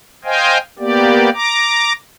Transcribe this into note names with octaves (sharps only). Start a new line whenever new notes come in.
C5 D#5 F5 G5 G#5
A#3 B3 G4 D5
A#5 D6